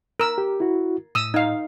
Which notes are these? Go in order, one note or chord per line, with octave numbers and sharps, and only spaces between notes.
A#4 E6
G4
E4 F#4
A2 D#6 E6
D#4 F5